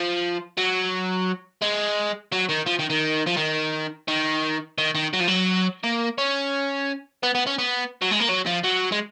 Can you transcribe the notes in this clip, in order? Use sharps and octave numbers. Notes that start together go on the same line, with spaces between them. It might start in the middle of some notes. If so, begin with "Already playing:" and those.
Already playing: F3
F#3
G#3
F#3
D#3
F3
D#3
D#3
F3
D#3
D#3
D#3
D#3
F#3
F3
F#3
A#3
C#4
B3
B3
C#4
B3
F#3
G#3
A#3
F#3
F3
F#3
G#3